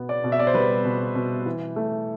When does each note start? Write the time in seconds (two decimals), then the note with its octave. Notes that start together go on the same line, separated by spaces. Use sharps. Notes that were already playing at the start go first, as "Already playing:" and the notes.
Already playing: B2 B3
0.09 D5
0.24 B2
0.32 E5
0.39 D5
0.47 C5
0.54 G3 B4
0.85 B2
1.15 B2
1.46 E3
1.76 A3